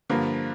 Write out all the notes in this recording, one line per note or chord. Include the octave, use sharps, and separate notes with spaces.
G2 D3 F3 A#3